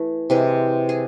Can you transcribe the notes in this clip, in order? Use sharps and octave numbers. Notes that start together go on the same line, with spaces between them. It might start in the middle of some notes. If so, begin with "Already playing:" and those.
Already playing: E3 A3
C3 E3 G#3
G#4